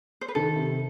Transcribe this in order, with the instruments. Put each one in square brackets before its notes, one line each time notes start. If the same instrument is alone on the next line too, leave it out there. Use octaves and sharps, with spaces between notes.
[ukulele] C5
B4
[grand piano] D#3 [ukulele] A4
[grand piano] C3